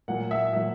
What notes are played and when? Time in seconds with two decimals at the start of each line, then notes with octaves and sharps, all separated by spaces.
0.08 A#2 F#3 F#5
0.31 E5
0.53 A#2 F#3 E5